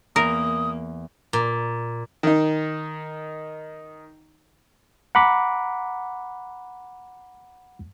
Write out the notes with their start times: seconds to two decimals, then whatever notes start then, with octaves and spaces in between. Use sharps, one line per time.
0.16 E2 A#3 A#4 D#6
1.33 A#2
2.23 D#3 D#4
5.15 F#5 A#5 B5 D6